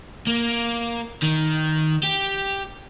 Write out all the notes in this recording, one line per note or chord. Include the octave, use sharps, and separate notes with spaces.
A#3
D#3
G4